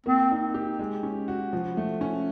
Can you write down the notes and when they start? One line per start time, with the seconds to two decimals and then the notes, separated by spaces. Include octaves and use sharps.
0.06 A#3 C4
0.31 D#4
0.54 G4
0.79 G#3
1.03 C#4
1.28 F#4
1.53 F3
1.77 A3
2.01 C#4